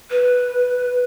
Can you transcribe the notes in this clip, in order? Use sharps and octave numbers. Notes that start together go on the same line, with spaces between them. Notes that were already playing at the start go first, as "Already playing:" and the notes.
B4